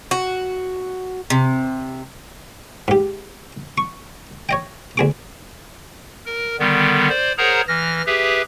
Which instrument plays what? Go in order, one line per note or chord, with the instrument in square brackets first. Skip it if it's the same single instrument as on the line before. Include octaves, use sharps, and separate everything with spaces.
[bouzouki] F#4
C3
[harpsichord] G#2 G4
C#6
C#5 D#5 G5
D2 G#4 D6
[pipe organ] A#4
D3 D#3 G3 B3
C5 D5
G#4 A#4 C5 C#5 F#5 A#5
E3 F6 A#6
G4 G#4 B4 E5